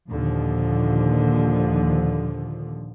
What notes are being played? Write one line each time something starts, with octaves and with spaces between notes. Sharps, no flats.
D#2 A#2 D3 F3